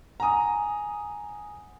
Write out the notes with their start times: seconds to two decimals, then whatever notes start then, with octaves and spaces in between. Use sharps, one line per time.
0.20 F#5 G#5 A#5 D#6